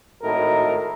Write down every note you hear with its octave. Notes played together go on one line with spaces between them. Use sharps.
G#1 A2 D#4 F#4 A4 A#4